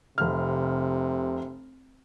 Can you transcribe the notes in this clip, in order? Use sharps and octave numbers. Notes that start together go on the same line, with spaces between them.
F1 C3 F6